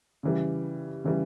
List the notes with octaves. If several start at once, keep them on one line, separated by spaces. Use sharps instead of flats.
C#3 E3 G3
C#3 E3 G3